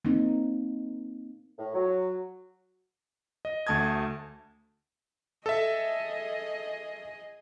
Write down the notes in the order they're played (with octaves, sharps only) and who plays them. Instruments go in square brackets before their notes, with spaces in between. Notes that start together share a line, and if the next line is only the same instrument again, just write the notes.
[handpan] A#3 C4 D#4
[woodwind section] A2
F#3
[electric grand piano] D#5
D2 A3 A5 D#6 G#6
[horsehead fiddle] G#4 D#5 [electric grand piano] A4 E5